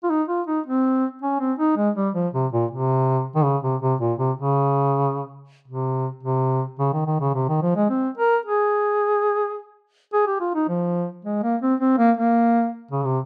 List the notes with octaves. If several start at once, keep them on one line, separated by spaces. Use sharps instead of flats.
F4
D#4
F4
D#4
C4
C#4
C4
D#4
G#3
G3
F3
C3
A#2
C3
D#3
C#3
C3
C3
A#2
C3
C#3
C3
C3
C#3
D#3
D#3
C#3
C3
D#3
F3
G#3
C4
A#4
G#4
G#4
G4
F4
D#4
F3
G#3
A#3
C4
C4
A#3
A#3
C#3
C3